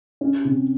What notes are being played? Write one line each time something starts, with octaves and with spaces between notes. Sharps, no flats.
C#4
C3